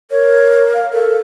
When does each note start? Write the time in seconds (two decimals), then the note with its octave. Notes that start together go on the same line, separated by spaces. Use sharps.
0.11 A#4 C#5
0.74 F5
0.93 A4 A#4